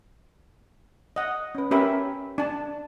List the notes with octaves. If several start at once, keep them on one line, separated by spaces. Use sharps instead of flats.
D#5 F#5
C#4 B4
C#4 G4 A#4 B4 E5
D4 A5